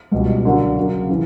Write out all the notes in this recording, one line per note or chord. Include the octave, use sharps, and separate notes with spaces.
C#2 B2 G3 C#4
D3 F#3 A#3 D4 F#4
C#3 F#3 A#3
C#3 E3